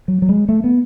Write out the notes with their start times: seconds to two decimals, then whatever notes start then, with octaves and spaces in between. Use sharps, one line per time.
0.08 F#3
0.22 F#3
0.29 G#3
0.49 A3
0.64 B3